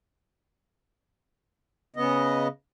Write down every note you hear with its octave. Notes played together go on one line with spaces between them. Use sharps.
C#3 B3 D#5